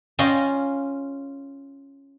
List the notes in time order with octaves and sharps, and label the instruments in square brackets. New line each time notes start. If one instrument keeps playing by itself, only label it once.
[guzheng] C#4 F4 D#5 G5